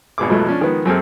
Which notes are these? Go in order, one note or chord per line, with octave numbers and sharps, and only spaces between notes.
G#1 B2 G#4 D6
F2 B2 F3 F#3 G#3 A3
F3 C#4 D4
D#3 F3 G#3 B3
F#2 F#3 C4 G#4 A4 F6